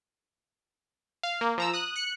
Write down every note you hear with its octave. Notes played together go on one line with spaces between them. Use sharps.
F5
A#3
F3 A#5 E6
D#6 F#6
F#6 C#7